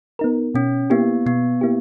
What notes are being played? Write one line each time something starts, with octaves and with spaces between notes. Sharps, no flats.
B3 D#4 A#4
B2 C#4
A#3 B3 E4 G4
B2 B3
A#3 E4 G4